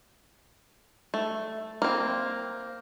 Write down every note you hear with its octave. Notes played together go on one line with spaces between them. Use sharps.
A3
A#3 C4